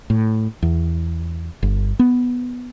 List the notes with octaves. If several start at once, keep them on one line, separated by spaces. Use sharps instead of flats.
A2
E2
G1
B3